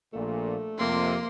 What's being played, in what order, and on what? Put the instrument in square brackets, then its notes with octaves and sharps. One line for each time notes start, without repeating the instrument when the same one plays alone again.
[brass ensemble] A#1 A#2 [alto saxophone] A3
[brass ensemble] F2 C3 [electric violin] A#3 C6